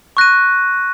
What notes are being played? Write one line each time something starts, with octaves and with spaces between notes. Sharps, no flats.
C#6 F#6 A#6 D#7